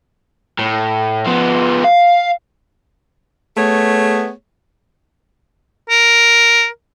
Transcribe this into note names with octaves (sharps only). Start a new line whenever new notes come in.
A2
F3 B3
F5
A3 B3 G#4 C#5
A#4